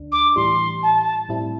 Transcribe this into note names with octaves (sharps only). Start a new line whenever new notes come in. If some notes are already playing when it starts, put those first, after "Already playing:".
Already playing: D2 D3 D4
D6
A2 E3 G3 C6
A5
A2 G3 C4 E4